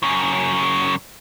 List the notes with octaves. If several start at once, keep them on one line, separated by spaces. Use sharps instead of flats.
F#2 C#3